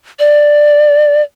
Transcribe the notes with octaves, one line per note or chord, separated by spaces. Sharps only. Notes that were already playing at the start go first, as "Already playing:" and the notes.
D5